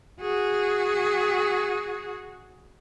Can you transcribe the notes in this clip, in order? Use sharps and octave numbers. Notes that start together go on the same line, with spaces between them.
F#4 G#4